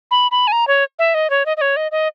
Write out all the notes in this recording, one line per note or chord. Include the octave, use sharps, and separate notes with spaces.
B5
B5
G#5
A#5
C#5
E5
D#5
C#5
D#5
D#5
C#5
D#5
D#5